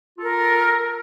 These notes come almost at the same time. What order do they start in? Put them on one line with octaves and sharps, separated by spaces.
F4 A4 A#4